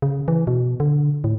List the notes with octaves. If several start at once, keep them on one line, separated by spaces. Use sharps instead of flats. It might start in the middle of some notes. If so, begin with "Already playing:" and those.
C#3
E3
B2
D3
A2